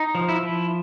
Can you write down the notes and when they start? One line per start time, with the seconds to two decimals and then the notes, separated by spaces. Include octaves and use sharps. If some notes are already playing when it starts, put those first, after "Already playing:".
Already playing: D#4
0.15 F3
0.29 E4
0.43 F3